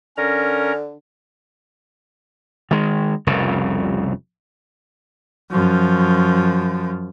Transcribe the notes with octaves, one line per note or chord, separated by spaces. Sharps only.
D3 C#4 A#4 A#5
D#3 G#3
F1 C2 F2 C#3
F#2 F3